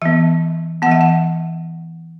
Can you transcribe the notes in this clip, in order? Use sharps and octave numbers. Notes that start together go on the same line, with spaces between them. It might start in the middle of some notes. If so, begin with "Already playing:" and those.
E3 B3 E5
E3 B3 F#5
E5
F#5